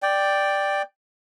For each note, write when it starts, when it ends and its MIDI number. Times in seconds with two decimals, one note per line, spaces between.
0.02 0.82 74
0.02 0.82 79